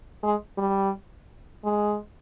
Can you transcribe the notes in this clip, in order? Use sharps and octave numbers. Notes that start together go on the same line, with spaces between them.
G#3
G3
G#3